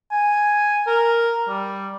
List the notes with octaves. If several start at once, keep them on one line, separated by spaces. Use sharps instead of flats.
G#5
A#4
G3